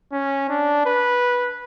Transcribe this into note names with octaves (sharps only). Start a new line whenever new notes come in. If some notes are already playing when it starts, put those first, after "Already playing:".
C#4
D4
B4